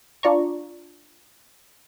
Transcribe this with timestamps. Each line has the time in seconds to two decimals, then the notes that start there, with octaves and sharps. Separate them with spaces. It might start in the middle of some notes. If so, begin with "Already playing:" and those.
0.23 D4 F4 D5 A#5 C#6